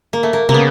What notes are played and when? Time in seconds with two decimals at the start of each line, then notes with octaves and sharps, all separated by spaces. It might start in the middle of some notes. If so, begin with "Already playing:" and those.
0.13 A#3
0.23 A3
0.33 A#3
0.49 C3 A#3
0.54 C#3 B3